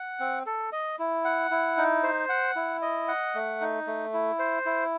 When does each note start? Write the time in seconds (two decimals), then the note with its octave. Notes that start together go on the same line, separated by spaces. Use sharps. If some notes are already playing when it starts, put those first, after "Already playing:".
Already playing: F#5
0.20 C4
0.46 A4
0.72 D#5
0.99 E4
1.24 F#5
1.51 E4
1.77 D#4
2.03 C5
2.29 F#5
2.56 E4
2.82 D#5
3.08 F#5
3.35 A3
3.61 D#4
3.87 A3
4.13 E4
4.39 C5
4.66 E4